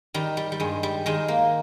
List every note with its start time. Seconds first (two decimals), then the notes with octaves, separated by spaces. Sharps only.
0.14 D#3 G3
0.37 G3
0.52 G3
0.60 G2 G#3
0.83 G3
1.06 D#3 G#3
1.28 A#3